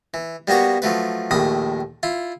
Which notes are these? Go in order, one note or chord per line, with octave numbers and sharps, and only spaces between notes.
E3
G3 A#3 B3 F#4 C#5
F3 F#3 A3 B4
A#1 D#2 A2 B5 D#6
E4 F4